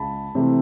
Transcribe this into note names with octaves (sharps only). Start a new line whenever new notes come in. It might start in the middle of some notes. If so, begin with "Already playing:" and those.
Already playing: C#2 A5 B5
C3 E3 A3 C4